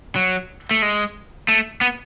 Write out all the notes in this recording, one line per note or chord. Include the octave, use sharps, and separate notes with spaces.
F#3
A3
G#3
A3
B3